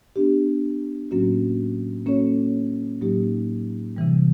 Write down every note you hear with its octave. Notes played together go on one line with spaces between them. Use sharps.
B3 D4 G4
A2 F#3 A#3 C#4 F#4
A#3 C#4 F#4 A4 C#5
A2 F#3 A#3 D#4 G4
C3 E3 G3